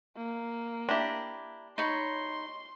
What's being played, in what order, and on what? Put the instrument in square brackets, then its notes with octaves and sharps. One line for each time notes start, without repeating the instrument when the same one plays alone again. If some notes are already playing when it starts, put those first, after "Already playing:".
[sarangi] A#3
[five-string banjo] D4 G4 [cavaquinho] E4 A#5
[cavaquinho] D#4 C#5 B5 [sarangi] C6